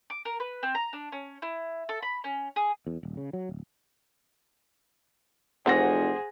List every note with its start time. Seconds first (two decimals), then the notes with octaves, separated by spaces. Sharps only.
0.10 D6
0.25 A#4
0.40 B4
0.63 C4
0.75 A#5
0.93 D4
1.12 C#4
1.42 E4
1.89 A4
2.03 B5
2.24 C#4
2.56 G#4
2.87 E2
3.03 D#1
3.17 C#3
3.33 F#3
3.49 D1
5.66 F1 E3 C4 F#4 G#4 C5 F#5 A#6